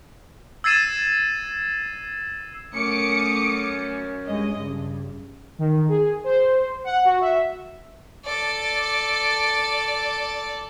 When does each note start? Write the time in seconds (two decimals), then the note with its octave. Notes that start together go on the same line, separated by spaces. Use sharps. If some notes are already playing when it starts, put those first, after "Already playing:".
0.64 E6 G#6 A6 C7 D#7 E7
2.74 F#2 A3 C#4 D6 D#6 C#7
4.27 G2 G#3 D#5
4.60 G2 C#3
5.59 D#3
5.89 G#4
6.24 C5
6.84 F#5
7.04 F#4
7.21 E5
8.25 A4 D5